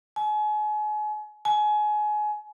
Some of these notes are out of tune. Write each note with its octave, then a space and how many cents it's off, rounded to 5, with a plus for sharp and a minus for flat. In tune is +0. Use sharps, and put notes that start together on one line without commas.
G#5 +35
G#5 +25